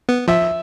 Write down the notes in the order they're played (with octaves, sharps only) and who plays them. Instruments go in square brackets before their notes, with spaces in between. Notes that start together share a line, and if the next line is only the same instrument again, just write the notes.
[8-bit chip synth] B3
[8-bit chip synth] F3 [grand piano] E5